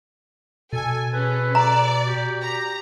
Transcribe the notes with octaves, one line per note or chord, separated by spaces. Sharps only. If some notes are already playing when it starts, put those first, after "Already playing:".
B2 A4 G#5
C#4 G#4 A4 B4
D5 A#5
F#4 G4
A#5